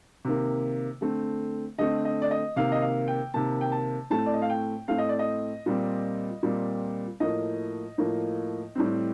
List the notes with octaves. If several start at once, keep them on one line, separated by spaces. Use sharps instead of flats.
C3 D#3 A#3
D3 A3 C4
D3 A3 C4 D#5
D#5
D5
D#5
C3 D#3 A#3 F5
D#5
F5
G5
C3 D#3 A#3 A5
G5
A5
A2 A3 C4 A5
D5
D#5
F5
G5
A2 A3 C4 F5
D#5
D5
D#5
A#2 G3 C4
A#2 G3 C4
A2 F3 A#3 D#5
A2 F3 A#3
A2 G3 C4